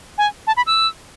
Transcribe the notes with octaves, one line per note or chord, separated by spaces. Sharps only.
G#5
A5
B5
E6